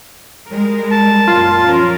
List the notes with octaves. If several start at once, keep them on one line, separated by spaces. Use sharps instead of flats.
G3 G#3 A#4
A5
F#2 A#2 F4
F3 C#4 A#4